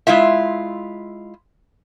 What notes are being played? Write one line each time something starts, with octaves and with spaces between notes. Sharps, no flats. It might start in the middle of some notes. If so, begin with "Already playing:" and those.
G#3 E4 F4 E5